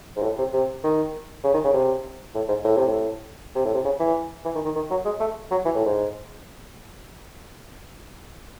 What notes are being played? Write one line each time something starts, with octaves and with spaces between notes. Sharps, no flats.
G#2
A2
C3
C3
D#3
C#3
D#3
C#3
C3
A2
G#2
A2
C3
A2
C3
A2
C3
C#3
E3
E3
D#3
D#3
D#3
F#3
G#3
A3
F#3
E3
A2
G#2